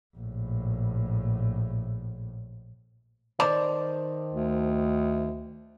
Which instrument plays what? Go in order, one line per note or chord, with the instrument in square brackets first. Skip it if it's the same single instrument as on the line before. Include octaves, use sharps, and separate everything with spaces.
[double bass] A#1 A2
[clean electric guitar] D#3 C5 A5 [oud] D5
[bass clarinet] D2